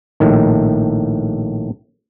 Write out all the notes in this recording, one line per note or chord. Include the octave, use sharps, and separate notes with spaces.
A#1 A2 D#3